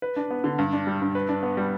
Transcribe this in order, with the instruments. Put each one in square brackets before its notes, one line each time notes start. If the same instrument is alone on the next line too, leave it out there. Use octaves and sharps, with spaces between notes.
[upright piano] B4
D4
B3
D3
G2
D4
G3
G2
B4
D4
B3
G3